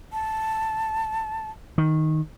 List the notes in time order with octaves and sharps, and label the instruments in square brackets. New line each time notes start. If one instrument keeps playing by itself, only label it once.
[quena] A5
[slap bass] D#3